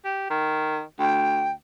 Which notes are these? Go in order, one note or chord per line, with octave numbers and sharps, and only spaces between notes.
G4
D#3
D2 G5